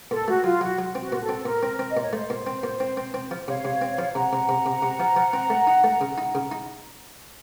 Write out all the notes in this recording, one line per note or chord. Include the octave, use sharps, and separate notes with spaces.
A#2 A4
A3 F#4
F#3 F4
F#3 F#4
F#3
C4
F#4
A#2
A4
C4
A#2 A#4
C4
C4
D#5
A#2
C#5
A3 C5
A#2
C4
A#2
C4
C4
C4
F3
C3 C#5 F5
C3
C4
F3
C3 F#5 A#5
C3
C3
C3
C3
F3
F3
C4
A3
D#4
A3
C#3
D#4
C#3
D#4